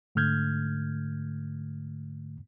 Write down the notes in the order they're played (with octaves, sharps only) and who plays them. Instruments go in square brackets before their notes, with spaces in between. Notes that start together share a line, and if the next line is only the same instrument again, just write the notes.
[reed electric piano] G#2 D3 A3 F6 G6 G#6